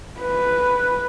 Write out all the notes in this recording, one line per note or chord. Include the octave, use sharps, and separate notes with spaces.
B4